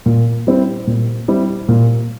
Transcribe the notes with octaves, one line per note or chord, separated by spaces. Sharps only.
A#2
G3 C4 E4
A#2
G3 C4 E4
A#2